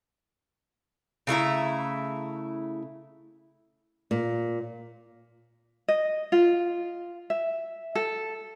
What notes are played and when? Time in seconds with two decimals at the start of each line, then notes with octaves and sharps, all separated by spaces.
1.27 C#3 A3 E4 A#5
4.11 A#2
5.88 D#5
6.32 F4
7.30 E5
7.95 A4